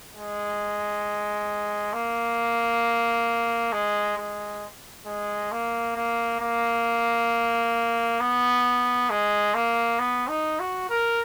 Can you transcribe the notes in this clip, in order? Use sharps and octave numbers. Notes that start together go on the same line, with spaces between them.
G#3
A#3
G#3
G#3
G#3
A#3
A#3
A#3
B3
G#3
A#3
B3
D#4
F#4
A#4